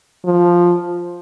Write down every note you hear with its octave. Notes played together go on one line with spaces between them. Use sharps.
F3